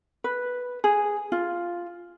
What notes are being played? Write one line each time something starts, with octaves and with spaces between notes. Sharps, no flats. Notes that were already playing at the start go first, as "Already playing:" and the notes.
B4
G#4
F4